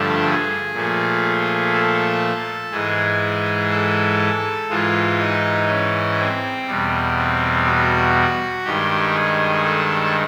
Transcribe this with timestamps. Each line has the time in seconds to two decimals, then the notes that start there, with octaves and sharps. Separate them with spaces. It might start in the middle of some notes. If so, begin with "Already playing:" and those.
Already playing: G2 D3 F3 A3 A4
0.26 G#4
0.74 A#2 F3 A3
1.73 A4
2.71 G#2 E3 G#3 G#4
3.71 A4
4.69 G#2 E3 G#3 F4
5.19 D#4
5.68 C#4
6.18 C4
6.67 E2 B2 G3
7.16 C4
7.66 F#4
8.65 G2 D#3 G#3 G4
9.14 G#4
9.64 A4